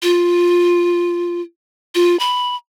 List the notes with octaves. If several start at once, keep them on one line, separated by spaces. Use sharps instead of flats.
F4
F4
B5